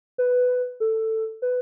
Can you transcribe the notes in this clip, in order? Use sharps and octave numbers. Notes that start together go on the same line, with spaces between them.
B4
A4
B4